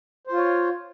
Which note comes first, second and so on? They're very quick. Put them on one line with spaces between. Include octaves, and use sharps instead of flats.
C5 F4 C#5